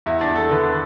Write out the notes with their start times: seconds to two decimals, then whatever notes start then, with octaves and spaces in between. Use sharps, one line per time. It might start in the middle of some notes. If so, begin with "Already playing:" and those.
0.06 E2 E4
0.21 D4
0.28 E2
0.36 A4
0.50 D3 B4